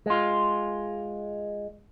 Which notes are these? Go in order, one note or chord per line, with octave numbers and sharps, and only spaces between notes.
G#3 F4